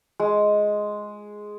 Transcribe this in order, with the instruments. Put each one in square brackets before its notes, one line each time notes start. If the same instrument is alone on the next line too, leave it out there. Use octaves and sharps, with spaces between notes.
[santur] G#3